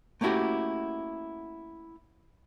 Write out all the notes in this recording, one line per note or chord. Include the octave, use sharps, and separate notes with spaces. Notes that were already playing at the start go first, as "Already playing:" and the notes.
A3 A#3 C#4 E4 F#4 G4